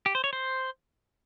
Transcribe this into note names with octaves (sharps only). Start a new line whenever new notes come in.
G4
C5
C#5
C5